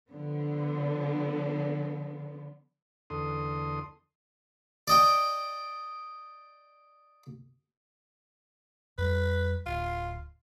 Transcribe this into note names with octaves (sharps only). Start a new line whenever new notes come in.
D3 F3 B3
E2 D3 A4 C6 D#6
D5 D#5 G5
F2 G3 B4
D1 F4